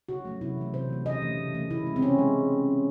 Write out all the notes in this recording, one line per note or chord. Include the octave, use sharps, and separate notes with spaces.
C#3 F#4
F#3 A3
C3 E4
E3 A3
C3 C5
E3 A3
C#3 D#5
E3 A3
C#3
E3 A3
C#3 E4
G#3
C4
C#3 C#4
G#3